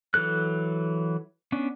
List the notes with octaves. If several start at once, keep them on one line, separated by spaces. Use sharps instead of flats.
E3 F#3 A4 F#6
B3 C#4 D4